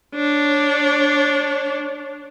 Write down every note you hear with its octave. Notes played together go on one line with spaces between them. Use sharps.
D4 C#5